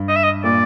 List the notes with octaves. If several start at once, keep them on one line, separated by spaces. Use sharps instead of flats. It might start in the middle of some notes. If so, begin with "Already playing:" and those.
Already playing: G2
D#5
E5
D#5
A#2 D5